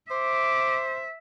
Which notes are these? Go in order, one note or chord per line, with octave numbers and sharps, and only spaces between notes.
C5 E5 D6